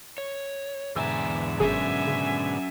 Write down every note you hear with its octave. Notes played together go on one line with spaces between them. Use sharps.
C#5
E2 G#2 B2 D3 E5 G#5 A#5 E6
G1 F#3 C#4 G#4 E5 G#5
C#3